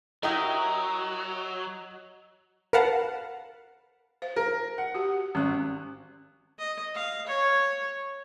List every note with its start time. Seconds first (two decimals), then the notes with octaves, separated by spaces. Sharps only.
0.23 F#3 E4 G4 A#4 D#5 D#6
2.73 A#4 B4 F5 F#5 A5
4.22 C5 F5
4.36 A#4
4.78 F#5
4.95 F#4 G4
5.35 G#1 C#4 F#6
6.59 D#5
6.94 F5
7.26 C#5